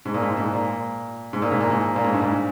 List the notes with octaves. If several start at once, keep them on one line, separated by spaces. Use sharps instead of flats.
G#2
A#2
G#2
G#2
A#2
G#2
A#2
G#2
A#2
G#2
A#2
G#2
G2
G#2